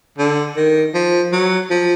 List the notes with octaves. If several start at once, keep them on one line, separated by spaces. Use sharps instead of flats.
D3
D#3
F3
F#3
F3